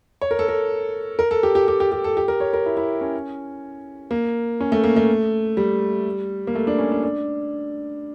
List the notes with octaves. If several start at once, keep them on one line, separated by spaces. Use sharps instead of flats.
C#5
A#4
A4
A#4
A#4
A4
G4
G4
G4
G4
G4
A4
G4
A#4
C#5
A#4
E4
E4
C#4
A#3
C#4
A3
A#3
A3
G3
A#3
A3
D4
C#4
D4
D4